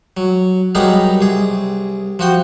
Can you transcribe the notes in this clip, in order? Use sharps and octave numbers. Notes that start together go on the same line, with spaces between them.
F#3
F#3 G3 B3 D#4 G#4 A#4
C2 G#4
F3 F#4 G5